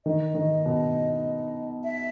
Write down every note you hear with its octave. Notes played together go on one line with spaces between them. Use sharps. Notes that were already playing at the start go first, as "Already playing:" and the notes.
D#3 D#5
D#3
B2
E5